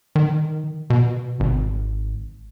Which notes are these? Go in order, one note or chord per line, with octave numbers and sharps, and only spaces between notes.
D#3
B2
G#1